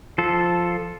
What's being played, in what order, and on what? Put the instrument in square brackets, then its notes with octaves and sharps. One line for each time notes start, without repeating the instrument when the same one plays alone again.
[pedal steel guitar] F3 F4 A4